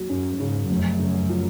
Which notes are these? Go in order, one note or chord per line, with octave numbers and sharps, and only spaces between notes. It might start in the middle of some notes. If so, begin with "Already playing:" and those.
Already playing: D#2 F#3
F#2 C#4
G#2 C#3
F1 F#2
C#3
F3